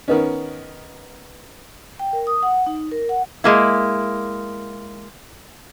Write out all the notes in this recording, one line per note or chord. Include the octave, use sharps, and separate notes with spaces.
D#3 B3 C#4
G5
A#4
D#6
F#5
D#4
A#4
F#5
G#3 A#3 E4